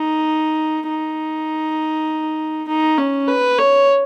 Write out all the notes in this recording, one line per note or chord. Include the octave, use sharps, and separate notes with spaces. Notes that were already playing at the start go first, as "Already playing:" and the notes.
Already playing: D#4
D#4
D#4
C#4
B4
C#5